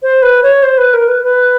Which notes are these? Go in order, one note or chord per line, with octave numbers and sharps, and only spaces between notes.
C5
B4
C#5
C5
B4
A#4
B4
B4